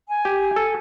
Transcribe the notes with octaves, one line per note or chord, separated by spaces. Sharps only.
G#5
G4
A4